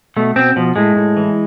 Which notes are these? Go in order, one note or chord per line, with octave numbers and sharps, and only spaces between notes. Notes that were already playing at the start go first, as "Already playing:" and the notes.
B2 A3
B2 C4
B2 F3
A2 G#3
A2
E3